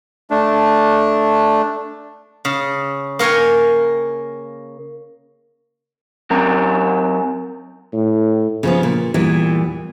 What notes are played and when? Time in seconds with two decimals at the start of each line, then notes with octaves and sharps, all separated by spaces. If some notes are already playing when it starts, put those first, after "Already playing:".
0.31 A3 D4
2.45 C#3
3.19 A#3 A#4 C#5 G5 G#5
6.30 F#3 C4 A#4 A#5
7.93 A2
8.63 C#3 F3 B3
8.83 A#2
9.14 E2 A#2 E3 G3